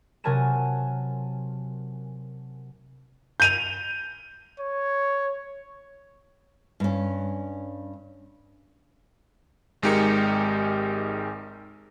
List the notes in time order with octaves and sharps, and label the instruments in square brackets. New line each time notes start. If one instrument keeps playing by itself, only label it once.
[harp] C3 F#3 A#4 G#5 A5 E7
[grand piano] G6 D#7 F7
[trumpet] C#5
[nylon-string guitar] G2 C#4
[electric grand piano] G#1 G#3 D#4 G4 A#4 C#7